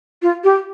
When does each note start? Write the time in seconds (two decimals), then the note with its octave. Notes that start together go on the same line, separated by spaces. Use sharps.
0.22 F4
0.44 G4